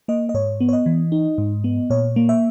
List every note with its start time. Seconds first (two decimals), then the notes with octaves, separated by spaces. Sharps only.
0.08 A#3 D#5
0.29 D#5
0.34 G#2 C#5
0.61 B3
0.69 C#5
0.73 D#5
0.86 E3
1.12 D#4
1.38 G#2
1.64 B3
1.90 A#2 C#5
2.16 A#3
2.29 E5